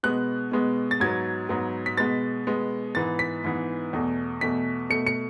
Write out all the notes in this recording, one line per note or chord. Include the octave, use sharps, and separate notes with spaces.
B2 G#3 B3 F#6
B2 G#3 B3
A6
G#2 F#3 B3 G#6
G#2 F#3 B3
B6
B2 G#3 B3 A6
B2 G#3 B3
G#2 E3 B3 A6
B6
G#2 E3 B3
E2 B2 A3
E2 B2 A3 B6
B2 A3 C#7
C#7